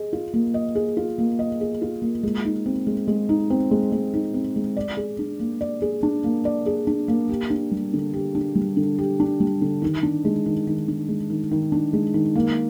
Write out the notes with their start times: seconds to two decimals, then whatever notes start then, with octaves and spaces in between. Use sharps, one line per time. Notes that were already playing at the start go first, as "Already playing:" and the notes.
Already playing: G#4 D#5
0.13 F4
0.34 A#3
0.54 D#5
0.75 G#4
0.97 F4
1.18 A#3
1.39 D#5
1.61 G#4
1.82 F4
2.02 A#3
2.23 G#3
2.45 D#4
2.66 C4
2.87 G#3
3.08 G#3
3.29 D#4
3.50 C4
3.71 G#3
3.92 G#3
4.14 D#4
4.34 C4
4.56 G#3
4.77 D5
4.97 G#4
5.19 D4
5.40 A#3
5.61 D5
5.82 G#4
6.03 D4
6.24 A#3
6.45 D5
6.66 G#4
6.87 D4
7.08 A#3
7.29 G4
7.50 D4
7.72 G3
7.93 D3
8.14 G4
8.35 D4
8.55 G3
8.77 D3
8.99 G4
9.20 D4
9.40 G3
9.62 D3
9.82 D#3
10.03 D4
10.25 G#3
10.46 D#3
10.67 D#3
10.88 D4
11.08 G#3
11.30 D#3
11.51 D#3
11.72 D4
11.93 G#3
12.14 D#3
12.35 A#3